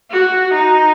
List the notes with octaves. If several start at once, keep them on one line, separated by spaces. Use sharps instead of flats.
F#4
D#4